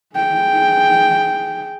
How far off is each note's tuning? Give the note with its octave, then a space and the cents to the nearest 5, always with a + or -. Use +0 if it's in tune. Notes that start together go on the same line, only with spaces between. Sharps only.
G#4 +0 G5 +0